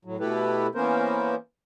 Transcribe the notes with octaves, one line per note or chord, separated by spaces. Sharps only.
A2 F#3
B2 A3 E4 G4 A4 B4
E3 A#3 B3 C#4 A#4 C5